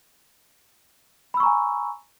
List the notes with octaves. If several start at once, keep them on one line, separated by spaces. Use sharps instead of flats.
G#5 A#5 B5 C#6 E6